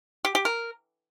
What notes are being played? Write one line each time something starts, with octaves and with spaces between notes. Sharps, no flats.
G4
G4
A#4